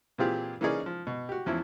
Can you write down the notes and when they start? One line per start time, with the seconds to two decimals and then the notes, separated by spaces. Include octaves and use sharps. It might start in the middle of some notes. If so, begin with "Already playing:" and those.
0.18 A#2 E3 C4 F4 G4 G#4
0.61 E3 A#3 C#4 D#4 G#4 D5
0.86 F3
1.07 B2
1.29 F#4 G4
1.46 E2 F3 C#4 E4